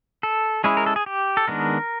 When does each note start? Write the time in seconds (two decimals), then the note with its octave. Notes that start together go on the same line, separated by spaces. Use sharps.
0.23 A4
0.64 G#3 C#4 E4 G#4
0.77 A#4
0.86 A4
0.96 G#4
1.06 G4
1.37 A4
1.48 D#3 G#3 B3 D4 A#4